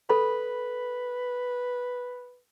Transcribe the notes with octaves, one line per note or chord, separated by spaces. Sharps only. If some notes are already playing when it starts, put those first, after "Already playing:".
A4 B4 B5